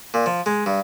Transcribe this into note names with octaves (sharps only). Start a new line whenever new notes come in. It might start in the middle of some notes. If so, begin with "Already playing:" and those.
A#2
F3
G#3
G2